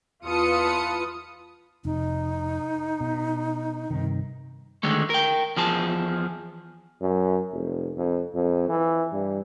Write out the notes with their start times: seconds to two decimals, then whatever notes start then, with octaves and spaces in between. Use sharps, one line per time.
0.24 E2 F4 B4 A5 D#6 C#7
1.85 F1 D#4
3.00 B2
3.90 G2 C3 D#3
4.83 D3 D#3 G#3 A3
5.10 A#4 G5
5.57 E2 F3 G#4 A5
7.01 F#2
7.52 F1
7.97 F2
8.34 F2
8.68 E3
9.12 G2